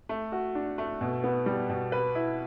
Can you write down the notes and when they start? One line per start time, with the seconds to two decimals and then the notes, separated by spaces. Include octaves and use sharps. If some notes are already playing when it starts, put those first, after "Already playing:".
0.09 A3
0.32 F#4
0.55 D4
0.78 A3
1.01 B2
1.24 B3
1.46 G3
1.69 B2
1.92 B4
2.15 E4